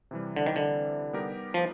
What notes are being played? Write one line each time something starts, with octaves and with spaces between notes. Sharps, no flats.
C3 E3 G3
D3
D#3
D3
G3 B3 D#4 G4 A#4
F3